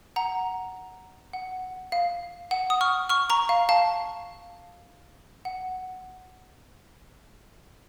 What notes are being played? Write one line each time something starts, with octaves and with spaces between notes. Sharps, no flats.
F#5 A#5
F#5
F5
F#5
D#6
C#6 F6
C#6 F6
A#5 C#6
F5
F5 A5
F#5